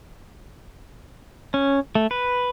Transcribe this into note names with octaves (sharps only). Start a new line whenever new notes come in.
C#4
A3
B4